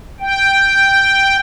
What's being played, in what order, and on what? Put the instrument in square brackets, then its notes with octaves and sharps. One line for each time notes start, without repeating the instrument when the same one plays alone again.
[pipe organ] G5